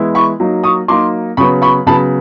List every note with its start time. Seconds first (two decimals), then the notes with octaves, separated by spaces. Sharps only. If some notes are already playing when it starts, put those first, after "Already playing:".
Already playing: E3 G#3 B3 E4
0.15 B5 C#6
0.40 F#3 A#3 D#4
0.64 C#6 D#6
0.88 F#3 A#3 D#4 C6 D6
1.37 C#3 F#3 B3 B5 C#6
1.62 B5 C#6
1.87 C#3 F#3 B3 A5 B5